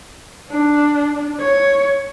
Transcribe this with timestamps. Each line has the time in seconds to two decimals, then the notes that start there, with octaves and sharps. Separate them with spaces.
0.50 D4
1.40 C#5